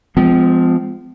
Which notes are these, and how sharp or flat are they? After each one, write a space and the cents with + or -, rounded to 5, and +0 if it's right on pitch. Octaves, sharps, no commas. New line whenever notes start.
F3 +0 G#3 +0 C4 -45